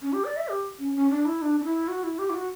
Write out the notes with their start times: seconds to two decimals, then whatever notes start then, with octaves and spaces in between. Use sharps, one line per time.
0.02 C#4
0.13 G4
0.25 D5
0.37 E5
0.48 G4
0.79 C#4
0.95 C#4
1.10 D4
1.26 E4
1.42 D4
1.60 D4
1.64 E4
1.88 F#4
2.04 E4
2.19 G4
2.30 E4
2.34 F#4